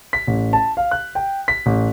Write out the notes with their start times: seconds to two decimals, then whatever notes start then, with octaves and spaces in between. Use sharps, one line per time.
0.13 B6
0.27 A1
0.53 A5
0.77 F5
0.91 F#6
1.15 G5
1.48 B6
1.66 A1